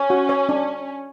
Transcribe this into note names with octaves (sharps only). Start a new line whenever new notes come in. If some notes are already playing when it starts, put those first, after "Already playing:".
Already playing: C#4 C#5
F#4
C#5
D4